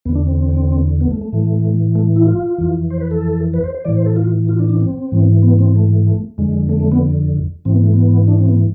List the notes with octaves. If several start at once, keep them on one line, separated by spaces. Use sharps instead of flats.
E2 D3 B3
D4
C4
B3
A3
A3
A2 E3
A3
E4
F4
F2 E3
C5
B4
A4
B4
C5
C5
A2 E3 D5
C5
A4
F4
F4
D4
D4
C4
G#2 E3
B3
C4
A3
F2 D3 G#3
A3
A3
B3
G#2 E3 C4
B3
A3
B3
D4
C4
B3